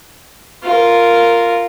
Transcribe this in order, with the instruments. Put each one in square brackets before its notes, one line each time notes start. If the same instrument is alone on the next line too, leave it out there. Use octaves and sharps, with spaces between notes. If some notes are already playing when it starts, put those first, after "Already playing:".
[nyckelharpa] F4 A#4